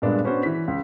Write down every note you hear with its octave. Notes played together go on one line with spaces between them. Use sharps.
G2 A#2 G#3 B3 D4
B3 C#4 D4 F#4 C5
E3 B6
C#2